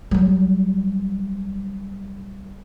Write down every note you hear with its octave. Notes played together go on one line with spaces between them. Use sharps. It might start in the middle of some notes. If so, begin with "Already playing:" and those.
F#3 G3